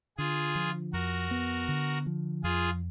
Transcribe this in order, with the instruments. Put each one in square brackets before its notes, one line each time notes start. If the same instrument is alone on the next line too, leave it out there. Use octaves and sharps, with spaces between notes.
[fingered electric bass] D3 [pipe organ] F4 G#4
[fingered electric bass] F3
[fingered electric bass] F2 [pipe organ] F#4 A#4
[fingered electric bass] B3
D3
F3
[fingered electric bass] F2 [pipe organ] F4 G#4